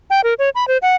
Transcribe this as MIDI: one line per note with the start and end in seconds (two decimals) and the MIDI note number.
0.10 0.21 79
0.24 0.34 70
0.39 0.49 73
0.55 0.67 83
0.68 0.77 72
0.82 0.96 78